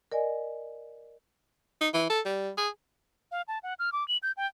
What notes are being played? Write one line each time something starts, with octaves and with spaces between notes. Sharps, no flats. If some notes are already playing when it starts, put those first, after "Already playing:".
A#4 D5 D#5 G#5
D#4
E3
A4
G3
G#4
F5
A5
F#5
F6
D6
F#7
G6
G5